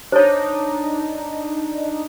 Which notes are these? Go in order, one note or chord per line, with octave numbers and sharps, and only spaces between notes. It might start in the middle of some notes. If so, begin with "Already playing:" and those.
D4 D#4 C5 C#5